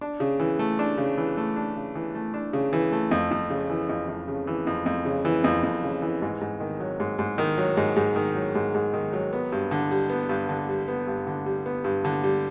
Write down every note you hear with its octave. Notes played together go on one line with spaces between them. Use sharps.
D4
C#3
E3
A3
D4
C#3
E3
A3
D4
C#3
E3
A3
D4
C#3
E3
A3
F2
F2
C#3
E3
F2
F2
C#3
E3
F2
F2
C#3
E3
F2
F2
C#3
E3
G#2
G#2
D#3
F#3
G#2
G#2
D#3
F#3
G#2
G#2
D#3
F#3
G#2
G#2
D#3
F#3
B3
G2
D3
G3
B3
G2
D3
G3
B3
G2
D3
G3
B3
G2
D3
G3